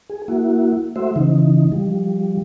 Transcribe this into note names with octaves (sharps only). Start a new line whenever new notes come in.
G#4
A#3 E4 F#4
A3 F#4 C5 E5
C#3 E3 D#4
F3 G3